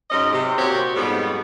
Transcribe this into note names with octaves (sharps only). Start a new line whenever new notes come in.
G#2 F#3 C#4 D#5
C3
A#2 C4 F#4 G4 C#5
F2 G#2 G3 B3